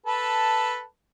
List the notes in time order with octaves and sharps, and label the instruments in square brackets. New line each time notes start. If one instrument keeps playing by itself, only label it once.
[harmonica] A4 B4 A5